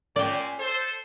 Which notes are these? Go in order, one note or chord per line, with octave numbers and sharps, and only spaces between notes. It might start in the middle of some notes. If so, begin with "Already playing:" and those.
A#2 C#4 D5 G5
A4 C5